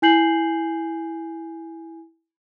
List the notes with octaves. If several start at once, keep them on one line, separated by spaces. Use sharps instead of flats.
E4 G#5 G6 C7 F#7